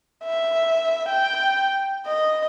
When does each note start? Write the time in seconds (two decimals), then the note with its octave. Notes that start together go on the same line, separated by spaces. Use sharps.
0.24 E5
1.09 G5
2.07 D#5